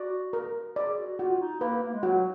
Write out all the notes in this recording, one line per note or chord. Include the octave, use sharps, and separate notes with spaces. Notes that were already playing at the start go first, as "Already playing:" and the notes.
Already playing: F#4 D5
A#4
G#4 D5
F#4
F4 F#4
D#4
A#3 B4
A#3
G#3
F#3 F#4